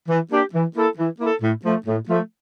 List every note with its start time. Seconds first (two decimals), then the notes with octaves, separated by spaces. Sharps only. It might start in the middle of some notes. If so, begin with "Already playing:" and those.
0.09 E3
0.30 A#3 D4 G4
0.53 E3
0.75 A#3 E4 A4
0.97 E3
1.19 A#3 E4 A4
1.41 A2
1.65 F3 A3
1.87 A2
2.08 F3 A3